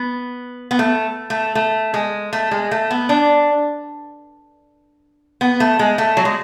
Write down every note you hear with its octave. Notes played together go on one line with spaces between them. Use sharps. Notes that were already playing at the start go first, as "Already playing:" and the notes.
Already playing: B3
B3
A3
A3
A3
G#3
A3
G#3
A3
B3
D4
B3
A3
G#3
A3
F#3
G#3